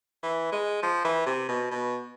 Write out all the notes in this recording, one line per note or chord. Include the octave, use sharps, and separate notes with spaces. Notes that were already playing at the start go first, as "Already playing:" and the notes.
E3
G#3
F3
E3
C3
B2
B2